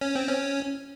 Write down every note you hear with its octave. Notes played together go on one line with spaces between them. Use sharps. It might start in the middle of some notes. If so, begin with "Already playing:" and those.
C#4
C4
C#4